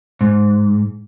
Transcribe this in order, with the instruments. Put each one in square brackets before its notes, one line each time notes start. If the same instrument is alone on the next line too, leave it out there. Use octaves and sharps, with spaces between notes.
[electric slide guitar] G#2